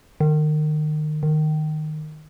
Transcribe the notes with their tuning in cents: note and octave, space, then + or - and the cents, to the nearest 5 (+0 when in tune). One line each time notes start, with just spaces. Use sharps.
D#3 -30
D#3 -15